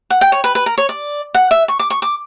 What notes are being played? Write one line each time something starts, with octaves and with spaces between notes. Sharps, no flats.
F#5
G5
C#5
B4
B4
A#4
C#5
D5
F#5
E5
C#6
D6
C#6
D6